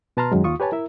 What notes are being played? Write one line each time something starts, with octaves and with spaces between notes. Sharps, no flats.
B2 B4 A5 A#5 C6 F6
F#2 D#3 F#3 G#3
D#2 F4 C#6 D#6
G4 B4 C#5 G#5 A5
E4 A#4 E5